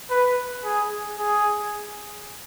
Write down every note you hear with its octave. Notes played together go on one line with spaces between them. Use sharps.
B4
G#4
G#4